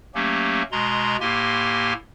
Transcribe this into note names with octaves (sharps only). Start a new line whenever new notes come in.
F#3 A3 A#3 C#4 G4
B2 G#3 A#5 C6
A2 A#3 G4 G#5 C6